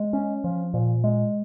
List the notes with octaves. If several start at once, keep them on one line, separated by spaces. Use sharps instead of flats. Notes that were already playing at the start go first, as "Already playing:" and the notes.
Already playing: G#3
C#4
F3
A#2
G#3